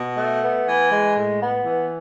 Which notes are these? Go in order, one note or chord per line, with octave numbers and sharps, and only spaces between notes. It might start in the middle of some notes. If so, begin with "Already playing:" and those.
Already playing: B2
A3
B3
E3
G#3
A2
B3
E3